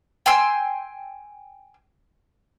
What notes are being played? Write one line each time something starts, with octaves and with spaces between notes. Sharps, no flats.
G5 G#5 C6 E6